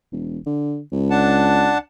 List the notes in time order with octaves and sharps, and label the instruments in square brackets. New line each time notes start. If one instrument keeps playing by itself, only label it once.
[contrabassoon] E1
D3
C#2
[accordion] D4 F#5 A5